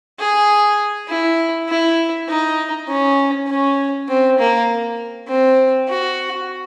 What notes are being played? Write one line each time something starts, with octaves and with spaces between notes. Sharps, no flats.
G#4
E4
E4
D#4
C#4
C#4
C4
A#3
C4
F#4